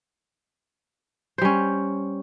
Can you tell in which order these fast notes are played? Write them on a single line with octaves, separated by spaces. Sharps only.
C5 G3 C#4